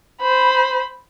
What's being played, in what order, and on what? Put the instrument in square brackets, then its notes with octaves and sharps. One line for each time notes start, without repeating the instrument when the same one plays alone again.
[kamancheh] C5 B5